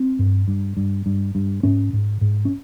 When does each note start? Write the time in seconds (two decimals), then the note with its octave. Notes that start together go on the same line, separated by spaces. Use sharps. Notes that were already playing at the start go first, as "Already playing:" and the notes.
Already playing: C4
0.19 G2
0.48 G2
0.77 G2
1.06 G2
1.35 G2
1.63 G#2 C#4
1.93 G#2
2.21 G#2
2.45 C#4